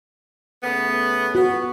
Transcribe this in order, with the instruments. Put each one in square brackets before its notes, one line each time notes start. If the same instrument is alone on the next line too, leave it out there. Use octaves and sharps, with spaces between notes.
[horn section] C#3 A3 B3
[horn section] B3 [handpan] F#4